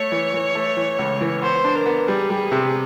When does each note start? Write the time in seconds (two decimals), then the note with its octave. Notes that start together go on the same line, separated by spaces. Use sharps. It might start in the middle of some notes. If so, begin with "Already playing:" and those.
Already playing: A3 C#5
0.12 E3
0.34 E3
0.55 A3
0.77 E3
0.99 C#2
1.21 E3
1.42 B3 C5
1.64 D4
1.75 A#4
1.86 B3
2.08 G3 G#4
2.30 G3
2.52 C3